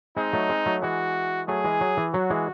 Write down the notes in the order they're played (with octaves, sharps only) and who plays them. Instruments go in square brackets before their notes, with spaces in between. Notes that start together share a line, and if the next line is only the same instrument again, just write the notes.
[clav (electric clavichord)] G#3 C4 [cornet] D#4
[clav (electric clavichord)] F#3 A3
G#3 C4
F#3 A3
[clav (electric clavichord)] E3 G#3 [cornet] F#4
[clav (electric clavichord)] F#3 A3 [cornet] G#4
[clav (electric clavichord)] E3 G#3
F#3
E3
[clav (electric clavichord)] F#3 [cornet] F#4
[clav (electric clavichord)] E3 G#3